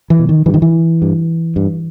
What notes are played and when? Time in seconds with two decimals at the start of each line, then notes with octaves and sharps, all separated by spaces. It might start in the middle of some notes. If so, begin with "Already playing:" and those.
0.10 E3
0.19 B2
0.29 D#3
0.46 G2 E3
0.54 D#3
0.62 E3
1.02 G2
1.56 G2